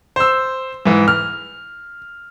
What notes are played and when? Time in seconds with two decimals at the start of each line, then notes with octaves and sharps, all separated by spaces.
0.16 C5 E6
0.86 G#2 E3
1.08 F6